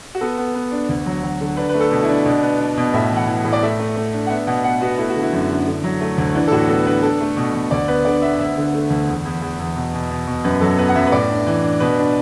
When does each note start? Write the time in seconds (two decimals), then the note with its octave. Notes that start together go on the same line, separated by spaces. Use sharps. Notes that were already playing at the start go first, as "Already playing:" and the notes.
0.15 F#4
0.21 B3 A4
0.38 B3
0.55 B3
0.71 D4
0.89 D2
1.06 F#3
1.23 F#3
1.41 D3
1.57 D4 B4
1.69 B4
1.74 A3
1.80 A4
1.91 B2
2.03 E4
2.09 D4
2.26 B2 D4
2.42 B3
2.60 D4
2.77 B2
2.94 A2 E5
3.11 E3
3.16 F#5
3.27 E3
3.45 A2
3.53 D5
3.62 A3 E5
3.79 A3
3.96 A3
4.13 D4
4.26 F#5
4.30 B3 E5
4.47 B2 F#5
4.64 B3 F#5
4.81 B3 F#4
4.98 A3 E4
5.10 F#4
5.15 D3
5.21 E4
5.33 F#2
5.49 D3
5.67 D3
5.84 F#3
6.01 A3
6.18 D2
6.35 E3 D4
6.48 A4
6.52 A2 F#4
6.69 B3 A4
6.87 D4 B4
7.03 D4 A4
7.21 A3
7.37 B2
7.54 B2
7.71 D2 D5
7.88 B3 B4
8.05 D3 D5
8.22 B3 E5
8.39 D2 E5
8.57 D3
8.73 A3
8.90 D2
9.07 E2
9.25 E2
9.42 E2
9.60 E2
9.76 B2
9.94 B2
10.11 B2
10.27 B2
10.44 F#2 B4
10.61 F#3 A4
10.78 B3 B4
10.89 F#5
10.95 F#2 E5
11.07 B4
11.12 A2 D5
11.30 D4
11.47 E3
11.64 D4
11.80 B2 B4
11.98 D4